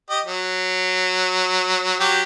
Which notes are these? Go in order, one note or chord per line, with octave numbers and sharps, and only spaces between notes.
G4 D#5
F#3
F#3 G4